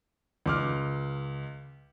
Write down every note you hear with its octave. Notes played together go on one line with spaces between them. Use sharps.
C#2 D6 F6